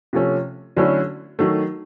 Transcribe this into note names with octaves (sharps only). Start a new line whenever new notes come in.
C3 F3 A3 C#4
D3 F#3 A3 C#4 E4
D#3 F#3 A3